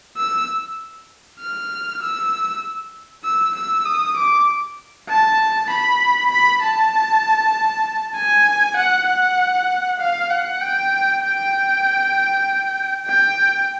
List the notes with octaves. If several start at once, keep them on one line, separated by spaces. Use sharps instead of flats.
E6
F6
E6
E6
E6
D#6
D6
A5
B5
B5
A5
G#5
F#5
F#5
F5
F#5
G5
G5
G5